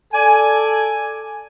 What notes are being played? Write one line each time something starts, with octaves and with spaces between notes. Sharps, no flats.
A4 D5 G#5